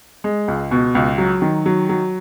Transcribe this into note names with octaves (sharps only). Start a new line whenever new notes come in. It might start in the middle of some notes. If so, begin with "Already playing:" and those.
G#3
C#2
B2
C#2
F#3
D#3
F#3
F#3